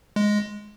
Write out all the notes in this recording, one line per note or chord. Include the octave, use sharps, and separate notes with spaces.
G#3